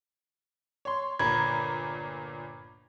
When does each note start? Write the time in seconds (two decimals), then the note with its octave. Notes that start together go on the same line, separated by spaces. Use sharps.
0.85 C#5 C6
1.19 G1 A#2 A#5 B5 G#6